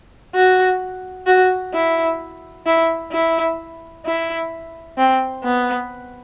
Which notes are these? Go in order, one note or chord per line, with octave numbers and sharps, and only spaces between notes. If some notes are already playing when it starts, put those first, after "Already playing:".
F#4
F#4
E4
E4
E4
E4
C4
B3